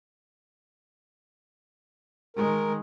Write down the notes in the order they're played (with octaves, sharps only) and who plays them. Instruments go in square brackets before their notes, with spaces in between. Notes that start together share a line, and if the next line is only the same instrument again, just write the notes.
[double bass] D#3 G#3 [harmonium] A#4